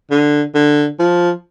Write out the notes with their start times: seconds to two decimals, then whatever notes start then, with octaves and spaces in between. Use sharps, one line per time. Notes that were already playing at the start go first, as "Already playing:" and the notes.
0.11 D3
0.55 D3
0.99 F3